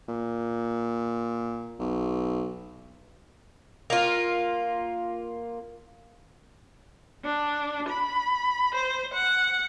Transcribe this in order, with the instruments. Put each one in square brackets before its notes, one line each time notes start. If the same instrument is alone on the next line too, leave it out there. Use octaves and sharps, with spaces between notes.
[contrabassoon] A#2
B1
[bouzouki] A#3 F4
[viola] D4
B5
C5
F#5